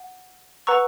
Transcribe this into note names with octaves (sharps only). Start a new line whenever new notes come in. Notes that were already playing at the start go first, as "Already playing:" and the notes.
Already playing: F#5
B4 F#5 A#5 C#6 E6